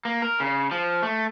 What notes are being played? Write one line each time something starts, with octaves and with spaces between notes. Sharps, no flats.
A#3
A#4
C#3
F3
A3